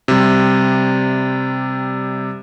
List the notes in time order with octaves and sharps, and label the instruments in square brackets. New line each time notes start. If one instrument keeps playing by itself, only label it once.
[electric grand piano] C3 G3